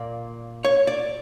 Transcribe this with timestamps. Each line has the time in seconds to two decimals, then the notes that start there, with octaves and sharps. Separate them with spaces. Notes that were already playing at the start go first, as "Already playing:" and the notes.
Already playing: A#2 A#3 D5
0.65 C#5
0.87 D5